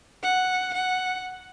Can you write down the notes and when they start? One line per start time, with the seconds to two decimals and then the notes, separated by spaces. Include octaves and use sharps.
0.23 F#5
0.74 F#5